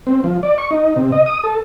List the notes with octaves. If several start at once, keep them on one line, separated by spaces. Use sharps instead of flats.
C4
F3
D5
C#6
D#4
C3
D#5
D#6
A4